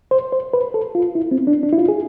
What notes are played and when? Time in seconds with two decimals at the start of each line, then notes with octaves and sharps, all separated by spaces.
0.11 C5
0.33 C5
0.54 B4
0.74 A4
0.95 F4
1.15 E4
1.31 C4
1.47 D4
1.63 D4
1.73 E4
1.78 F4
1.89 G#4